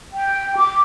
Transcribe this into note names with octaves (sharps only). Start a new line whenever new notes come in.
G5
D6